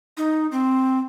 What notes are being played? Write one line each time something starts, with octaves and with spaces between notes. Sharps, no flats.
D#4
C4